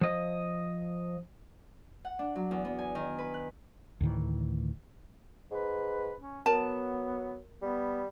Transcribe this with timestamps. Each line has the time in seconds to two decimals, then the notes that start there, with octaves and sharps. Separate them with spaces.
0.01 F3 D#5
2.05 F#5
2.19 D4
2.35 F#3
2.51 E2
2.65 B3
2.78 G#5
2.95 D#3
3.18 B4
3.34 F#6
4.01 D2 A2 D#3 E3
5.51 G#2 B4
6.21 C#4
6.46 F#3 B3 A#4 A5
7.62 G3 B3